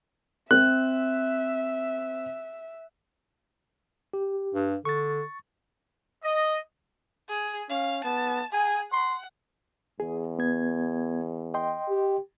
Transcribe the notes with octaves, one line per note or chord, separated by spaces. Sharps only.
C4 E5 F#6
G4
G2
D3 C#6 A6
D#5
G#4
C#4 F5
B3 A5
G#4 G#5
F#5 C6
E2 G#4
B3 G#6
D#5 G5 C6
G4